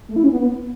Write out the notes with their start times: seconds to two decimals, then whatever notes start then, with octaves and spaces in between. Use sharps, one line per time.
0.09 A3
0.16 E4
0.24 C#4
0.31 B3